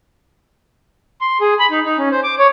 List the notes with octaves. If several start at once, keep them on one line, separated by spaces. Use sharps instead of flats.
C6
G#4
B5
D#4
D#4
C#4
C5
D6
C#5